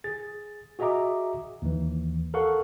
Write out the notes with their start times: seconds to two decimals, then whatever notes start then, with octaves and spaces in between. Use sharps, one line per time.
0.04 G#4 A6
0.79 F#4 G#4 D#5 E5 A#5 D6
1.62 D#2 E3
2.34 A4 A#4 F5 F#5 C#6